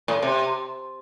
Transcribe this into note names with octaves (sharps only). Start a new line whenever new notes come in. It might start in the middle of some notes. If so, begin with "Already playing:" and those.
A2
C3